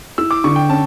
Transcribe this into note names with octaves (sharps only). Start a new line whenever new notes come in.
E4 E6
D6
D3 C#6
G5
C#4 A5